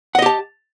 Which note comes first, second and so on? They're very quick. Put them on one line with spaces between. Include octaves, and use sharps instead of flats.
F#5 D#5 G4 A5